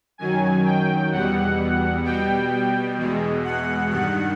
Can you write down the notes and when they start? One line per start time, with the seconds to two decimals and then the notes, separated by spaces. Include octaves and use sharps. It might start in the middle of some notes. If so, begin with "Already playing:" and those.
0.18 F#2 D#3 F#3 G#5
0.65 G5
1.11 E2 B2 G3 F#5
2.04 B2 G3 G5
2.97 E2 B2 G#3
3.44 F#5
3.90 G2 D#3 G3 F#5